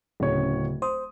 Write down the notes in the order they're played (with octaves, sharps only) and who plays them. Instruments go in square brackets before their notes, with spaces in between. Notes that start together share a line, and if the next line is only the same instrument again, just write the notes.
[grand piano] D1 C#5 [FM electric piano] C#3
[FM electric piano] C5 [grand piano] D#6